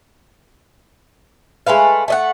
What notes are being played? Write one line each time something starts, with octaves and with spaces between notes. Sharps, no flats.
G#3 A3 B4 F5
A3 D#5 F#5